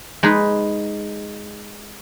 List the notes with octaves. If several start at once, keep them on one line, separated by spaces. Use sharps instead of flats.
G#3 D#4 G#4 B4